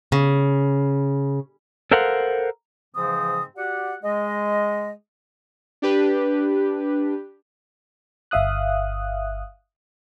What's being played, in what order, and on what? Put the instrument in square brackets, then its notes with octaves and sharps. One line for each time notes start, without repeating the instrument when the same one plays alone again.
[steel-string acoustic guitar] C#3
[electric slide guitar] A4 A#4 C5 F5 F#5
[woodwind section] G#2 C#3 E3 F3 C4 D#6
F#4 G4 D5 F#5
G#3 D#5
[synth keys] D4 G4 B4
[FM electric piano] G1 E5 F5 D#6 F#6